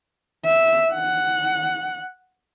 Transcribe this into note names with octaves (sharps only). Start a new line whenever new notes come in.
E5
F#5